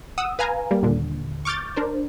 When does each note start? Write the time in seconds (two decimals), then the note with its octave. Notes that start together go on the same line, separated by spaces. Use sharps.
0.18 F#5 D#6 E6
0.39 B4 F5 G#5 A#5
0.71 G3 A#3
0.82 D#2 A#2 D3
1.45 C#6 D6 F6 G6 A6
1.76 D4 A#4 C5